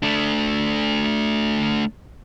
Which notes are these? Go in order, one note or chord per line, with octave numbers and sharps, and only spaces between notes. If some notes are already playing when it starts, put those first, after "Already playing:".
A3 D4